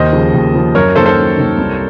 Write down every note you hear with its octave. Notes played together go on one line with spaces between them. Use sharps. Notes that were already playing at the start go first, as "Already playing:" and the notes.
Already playing: D#2 C5 D#5
C#3 F3
D#2
C#3 F3
F#2 A#4 C#5
D#3 A#3 A4 C5
A4 C5
F#2
D#3 A#3
C2